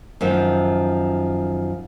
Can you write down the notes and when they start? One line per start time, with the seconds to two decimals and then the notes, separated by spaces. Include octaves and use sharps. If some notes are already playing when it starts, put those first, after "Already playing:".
0.21 F#2 D#3 F3